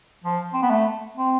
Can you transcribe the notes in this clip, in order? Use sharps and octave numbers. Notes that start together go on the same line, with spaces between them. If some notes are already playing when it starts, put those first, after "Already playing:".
F3
C4
B3
A3
C4